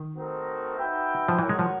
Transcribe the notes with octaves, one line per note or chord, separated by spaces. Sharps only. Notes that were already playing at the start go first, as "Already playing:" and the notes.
Already playing: D#3
A3 C4 D#4 F#4 A#4
D#4 F#4 B4 E5 G5
F3
E3 F#4 A#4 C#5 F#5
G#3
F3